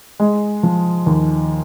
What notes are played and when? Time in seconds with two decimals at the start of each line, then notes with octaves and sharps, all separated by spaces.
0.20 G#3
0.63 F3
1.06 D#2